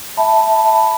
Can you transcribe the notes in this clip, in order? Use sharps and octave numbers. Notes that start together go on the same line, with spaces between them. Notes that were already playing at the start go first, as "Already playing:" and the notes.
E5 A5 B5